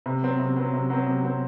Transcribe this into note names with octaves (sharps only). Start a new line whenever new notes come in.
C3
F#3 C4
C3
F#3 C4
C3
F#3 C4
C3
F#3 C4